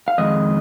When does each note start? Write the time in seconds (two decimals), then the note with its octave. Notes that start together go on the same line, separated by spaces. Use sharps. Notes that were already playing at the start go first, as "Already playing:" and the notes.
0.08 F5
0.18 F2 D#3 G#3 D#5